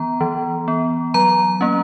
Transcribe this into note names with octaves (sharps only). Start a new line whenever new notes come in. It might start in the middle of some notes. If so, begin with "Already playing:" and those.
Already playing: E3 B3 A#5
E3
B3
F#3 A#5
A#3 C#4